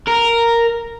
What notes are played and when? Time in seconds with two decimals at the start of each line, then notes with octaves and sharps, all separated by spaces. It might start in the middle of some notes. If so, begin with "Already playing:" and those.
0.07 A#4